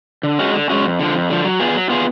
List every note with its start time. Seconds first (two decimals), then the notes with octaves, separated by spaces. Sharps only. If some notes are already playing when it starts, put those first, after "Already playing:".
0.23 D3
0.39 G#3 C#4 F#4
0.54 D3
0.70 G#3 C#4 F#4
0.84 F2
0.99 D3 F3
1.14 F2
1.30 D3 F3
1.44 F#3
1.59 B3 F4 G#4
1.75 F#3
1.90 B3 F4 G#4